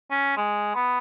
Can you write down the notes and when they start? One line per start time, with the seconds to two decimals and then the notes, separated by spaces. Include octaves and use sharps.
0.11 C#4
0.37 G#3
0.75 B3